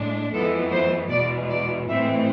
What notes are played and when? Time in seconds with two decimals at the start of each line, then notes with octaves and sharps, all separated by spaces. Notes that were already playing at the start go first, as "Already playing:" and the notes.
Already playing: A2 G#3 D4
0.32 F2 E3 G#3 B3 A4
0.72 C5
1.09 E2 B2 G#3 D5
1.49 D5
1.88 A2 E3 G#3 C4 E5